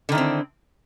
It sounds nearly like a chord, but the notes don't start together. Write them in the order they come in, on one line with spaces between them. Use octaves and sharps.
D3 D#3 E4 C4